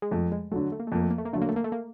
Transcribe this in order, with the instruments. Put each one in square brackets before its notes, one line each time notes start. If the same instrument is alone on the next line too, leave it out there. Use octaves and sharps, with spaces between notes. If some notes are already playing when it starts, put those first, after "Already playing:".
[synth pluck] G#3
[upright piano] F2 [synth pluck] A3
[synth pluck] G#3
[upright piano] F#3 [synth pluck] A3
[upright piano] D3
[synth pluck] A3
A#3
A3
[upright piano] F2 [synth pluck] A#3
[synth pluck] A3
A#3
A3
A#3
[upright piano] D3 F#3 [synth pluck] A3
[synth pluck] A#3
A3
A#3
A3
A#3